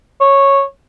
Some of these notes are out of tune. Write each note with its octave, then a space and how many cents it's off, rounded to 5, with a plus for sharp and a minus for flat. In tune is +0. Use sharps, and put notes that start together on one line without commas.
C#5 -10